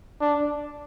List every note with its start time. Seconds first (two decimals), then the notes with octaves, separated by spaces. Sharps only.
0.21 D4